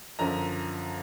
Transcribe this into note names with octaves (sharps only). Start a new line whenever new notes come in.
F#2 D3 F3 A#5